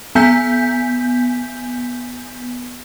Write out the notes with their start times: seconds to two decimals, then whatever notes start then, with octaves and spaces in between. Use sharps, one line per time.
0.15 B3 G#5 G6 B6